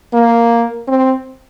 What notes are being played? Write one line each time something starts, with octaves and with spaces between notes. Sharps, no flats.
A#3
C4